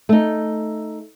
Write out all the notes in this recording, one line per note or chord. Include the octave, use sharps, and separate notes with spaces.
A3 D#4